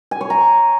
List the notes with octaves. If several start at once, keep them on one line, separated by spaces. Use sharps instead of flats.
G#5
C#5
A#5